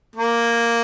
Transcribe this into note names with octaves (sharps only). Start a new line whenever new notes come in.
A#3